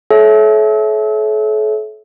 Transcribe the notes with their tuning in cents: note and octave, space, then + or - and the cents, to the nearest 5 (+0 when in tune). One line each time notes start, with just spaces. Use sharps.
A4 -40 C#5 +0 E5 +0